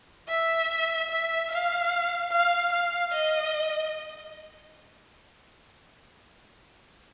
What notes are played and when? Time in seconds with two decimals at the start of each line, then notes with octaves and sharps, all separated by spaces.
0.28 E5
1.10 E5
1.50 F5
2.31 F5
2.72 F5
3.13 D#5